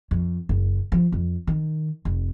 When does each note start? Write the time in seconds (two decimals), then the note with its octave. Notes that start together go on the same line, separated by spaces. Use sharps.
0.11 F2
0.49 F#1
0.92 F3
1.12 F2
1.47 D#3
2.05 F1